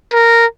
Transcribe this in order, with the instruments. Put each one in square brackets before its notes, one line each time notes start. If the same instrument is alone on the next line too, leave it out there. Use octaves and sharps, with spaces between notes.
[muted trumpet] A#4